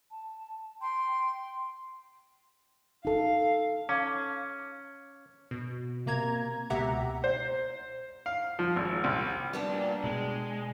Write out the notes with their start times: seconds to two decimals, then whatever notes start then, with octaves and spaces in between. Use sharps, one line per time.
0.11 A5
0.80 G5 C6
3.05 D#4 A4 F5
3.89 C#4 F5 A5 D6
5.51 B2
6.06 C3 A#3 A#5 G#6
6.70 C#2 B2 G4 E5 F#5 A#5
7.24 C5
8.26 F5
8.59 F3
8.76 G#1
9.04 C2
9.53 G3 B3 D4
9.72 A#2
10.04 B2 G#3